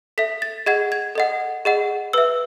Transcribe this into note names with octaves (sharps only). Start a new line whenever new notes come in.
A4 E5 B6
A6
G#4 D#5 F#5 G#6
G#6
A4 D#5 F#5
G#4 D#5 F#5
B4 E5 E6